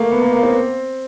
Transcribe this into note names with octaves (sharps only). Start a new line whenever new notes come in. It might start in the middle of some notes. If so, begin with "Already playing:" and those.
Already playing: A3 A#3
B3
A#3
A#3
C4